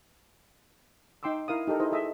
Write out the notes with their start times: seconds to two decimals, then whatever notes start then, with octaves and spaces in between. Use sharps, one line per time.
1.23 D#4 G5 C6 D6 E6
1.48 E4 A#4 F5 D#6
1.67 D#4 G4 A4 A#4
1.80 D#4 E4 G#4 C5 D#5
1.92 G#4 A4 D#5 E5